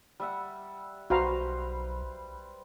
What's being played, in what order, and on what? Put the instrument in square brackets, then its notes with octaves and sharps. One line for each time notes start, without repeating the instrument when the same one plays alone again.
[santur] G3 E5 F#5
[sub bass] B1 [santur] G3 B4 C5 [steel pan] F#4 F5 A#5